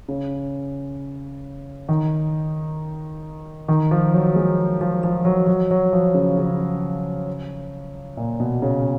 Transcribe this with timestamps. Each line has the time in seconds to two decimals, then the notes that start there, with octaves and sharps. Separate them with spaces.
0.08 C#3
1.89 D#3
3.68 D#3
3.91 F3
4.14 F#3
4.36 G#3
4.81 F3
5.03 F3
5.25 F#3
5.47 F#3
5.71 F#3
5.93 F3
6.14 C#3
6.38 C#3
8.17 A#2
8.40 B2
8.62 C#3